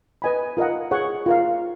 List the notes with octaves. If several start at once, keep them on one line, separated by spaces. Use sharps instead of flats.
B4 D#5 G#5 B5
F4 A#4 D#5 F#5
G#4 C#5 F#5 C#6
F4 A#4 F5